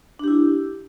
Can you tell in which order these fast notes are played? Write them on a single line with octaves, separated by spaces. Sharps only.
D4 G4 E4